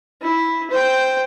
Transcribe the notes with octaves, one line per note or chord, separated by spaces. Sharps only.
E4
C5 G5